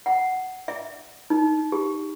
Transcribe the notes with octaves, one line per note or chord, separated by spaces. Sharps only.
F#5
E5
D#4
G4